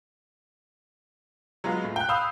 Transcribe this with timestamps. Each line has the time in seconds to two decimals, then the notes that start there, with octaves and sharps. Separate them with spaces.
1.64 F#3 G#3 B3 F4
1.84 A2
1.96 G5 F#6
2.09 F5 B5 D#6 E6 G6